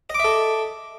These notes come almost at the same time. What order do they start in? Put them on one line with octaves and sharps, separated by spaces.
D#5 D6 E5 A4